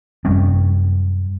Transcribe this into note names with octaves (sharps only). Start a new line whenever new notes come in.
F#2 C3 G3 C#4